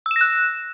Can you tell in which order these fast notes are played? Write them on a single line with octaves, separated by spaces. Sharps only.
E6 E7 A#6 F#6